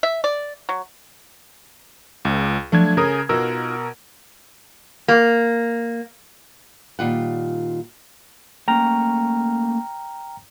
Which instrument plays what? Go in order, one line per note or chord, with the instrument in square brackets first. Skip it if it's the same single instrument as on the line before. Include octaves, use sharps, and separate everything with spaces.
[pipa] E5
D5
F#3
[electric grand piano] C#2
[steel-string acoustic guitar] F3 F#3 [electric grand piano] A3 D4 G#6
[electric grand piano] C#3 A#4 D#6 [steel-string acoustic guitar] A4 G#5
[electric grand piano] B2 A#4 E6 [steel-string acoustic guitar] D#4 F4 F#5
[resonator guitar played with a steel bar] A#3
[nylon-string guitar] A#2 D#3 G3 F4 D5 F#5
[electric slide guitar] A3 A#3 C#4 [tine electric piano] G5 A#5 F6